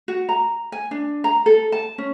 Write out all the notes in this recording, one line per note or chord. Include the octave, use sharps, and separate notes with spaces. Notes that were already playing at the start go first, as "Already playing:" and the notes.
F#4
A#5
G#5
D4
A#5
A4
A5
C#4